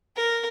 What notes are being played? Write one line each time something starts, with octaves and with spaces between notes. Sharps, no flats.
A#4